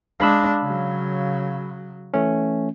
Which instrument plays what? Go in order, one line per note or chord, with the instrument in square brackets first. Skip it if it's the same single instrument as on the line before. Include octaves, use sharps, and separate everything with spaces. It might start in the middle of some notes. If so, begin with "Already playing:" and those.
[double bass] G#3 D4 [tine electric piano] F5 B5 E6
[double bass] C#3 F#3
[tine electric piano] E3 A3 C#4